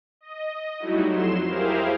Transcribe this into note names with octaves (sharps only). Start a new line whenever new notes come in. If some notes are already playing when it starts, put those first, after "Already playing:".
D#5
F#3 G3 A3 D#4 E4 F#4
F2 F#3 C6 E7
E4 G4 G#4 A#4 C5 F5